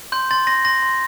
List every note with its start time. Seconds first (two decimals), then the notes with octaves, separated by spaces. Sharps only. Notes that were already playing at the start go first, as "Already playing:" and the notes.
0.12 C6 G6
0.31 C6 A6
0.47 C6 A#6
0.65 C6 A#6
0.82 C6